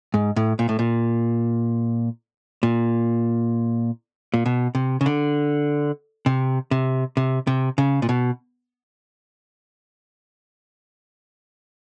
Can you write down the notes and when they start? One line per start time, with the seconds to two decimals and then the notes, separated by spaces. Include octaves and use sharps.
0.14 G#2
0.36 A2
0.59 A#2
0.69 A2
0.79 A#2
2.63 A#2
4.34 A#2
4.46 B2
4.75 C3
5.01 C#3
5.06 D3
6.26 C3
6.71 C3
7.17 C3
7.47 C3
7.78 C#3
8.02 A#2
8.09 B2